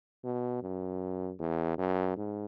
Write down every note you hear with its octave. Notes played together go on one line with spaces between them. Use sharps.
B2
F#2
E2
F#2
G#2